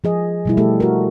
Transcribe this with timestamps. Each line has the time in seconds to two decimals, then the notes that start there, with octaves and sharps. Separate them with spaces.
0.04 F3 G#4 D#5
0.45 B2 G3 E4
0.57 A3 G4 A4
0.80 F#4 A#4